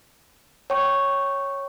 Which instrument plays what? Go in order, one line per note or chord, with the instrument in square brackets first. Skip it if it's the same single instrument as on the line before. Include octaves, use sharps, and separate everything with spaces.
[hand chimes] C#5 G5 C#6